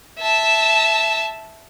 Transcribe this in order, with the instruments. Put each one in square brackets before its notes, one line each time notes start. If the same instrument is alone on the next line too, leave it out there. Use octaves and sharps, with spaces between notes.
[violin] E5 A5